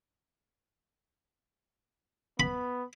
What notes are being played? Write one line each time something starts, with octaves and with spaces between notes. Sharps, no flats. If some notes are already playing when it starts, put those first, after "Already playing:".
B3 B5